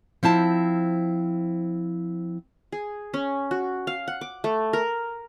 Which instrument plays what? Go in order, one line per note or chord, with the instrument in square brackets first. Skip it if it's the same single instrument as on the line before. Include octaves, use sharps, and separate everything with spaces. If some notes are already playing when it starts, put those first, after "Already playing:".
[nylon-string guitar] F3 C4 E4 A5
[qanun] G#4
C#4
F#4
F5
F#5
D6
A3
A#4